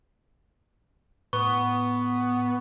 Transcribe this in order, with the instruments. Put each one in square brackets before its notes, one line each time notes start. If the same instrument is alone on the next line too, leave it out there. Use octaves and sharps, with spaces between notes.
[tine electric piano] A2 [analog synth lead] B3 [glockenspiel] C#6